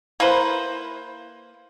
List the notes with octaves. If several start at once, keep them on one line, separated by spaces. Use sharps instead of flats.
A#3 E4 B4 C5